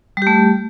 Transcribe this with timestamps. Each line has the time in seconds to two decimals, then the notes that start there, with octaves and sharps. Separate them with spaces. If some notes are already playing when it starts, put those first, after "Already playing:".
0.17 G3
0.22 G4
0.27 A3